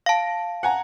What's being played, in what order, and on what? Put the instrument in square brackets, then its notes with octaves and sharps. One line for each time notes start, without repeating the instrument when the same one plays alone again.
[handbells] F5 A5
[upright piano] F#5 G#5 A#5